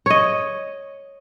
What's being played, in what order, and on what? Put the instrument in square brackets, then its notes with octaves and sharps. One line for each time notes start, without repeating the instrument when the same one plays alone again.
[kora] C#5 D#5